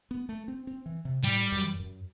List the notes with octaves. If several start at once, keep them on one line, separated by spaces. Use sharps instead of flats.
B3
A3
C4
C4
E3
C3
A2 G3
F#2
F#2